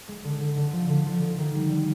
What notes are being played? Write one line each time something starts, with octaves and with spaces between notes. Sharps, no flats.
G#3
D3
D3
D3
F3
D3
F3
D3
D#3
G3
G3